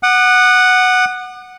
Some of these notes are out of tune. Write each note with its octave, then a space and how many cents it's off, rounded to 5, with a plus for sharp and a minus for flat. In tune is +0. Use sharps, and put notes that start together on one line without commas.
F#5 +0 D#6 -45